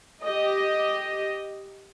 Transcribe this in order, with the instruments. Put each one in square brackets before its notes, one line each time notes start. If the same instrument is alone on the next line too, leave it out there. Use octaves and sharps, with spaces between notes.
[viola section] G4 D#5